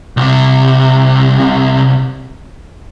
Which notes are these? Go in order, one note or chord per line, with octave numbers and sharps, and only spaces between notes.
C2 C3